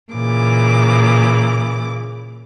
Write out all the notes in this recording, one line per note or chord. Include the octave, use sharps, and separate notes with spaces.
A#2 C#3 E3 D6